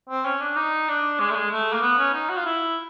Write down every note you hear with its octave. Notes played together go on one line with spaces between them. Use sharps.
C4
C#4
D4
D#4
D4
G#3
A3
G#3
A3
A#3
B3
C#4
D#4
F#4
F4
E4